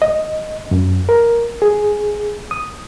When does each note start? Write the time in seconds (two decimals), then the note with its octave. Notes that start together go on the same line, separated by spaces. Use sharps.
0.02 D#5
0.71 F#2
1.09 A#4
1.62 G#4
2.51 D#6